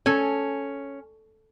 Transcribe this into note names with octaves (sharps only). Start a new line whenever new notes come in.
C#4 A4 G#5